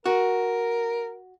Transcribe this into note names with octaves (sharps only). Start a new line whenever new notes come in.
F#4 A#4